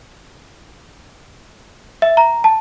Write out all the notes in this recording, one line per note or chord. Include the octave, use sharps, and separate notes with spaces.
E5
A#5
A5